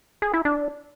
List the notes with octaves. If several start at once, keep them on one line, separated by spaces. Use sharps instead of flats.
G#4
E4
D4